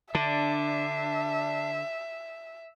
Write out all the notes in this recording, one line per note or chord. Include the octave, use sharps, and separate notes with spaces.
D3 D4 E5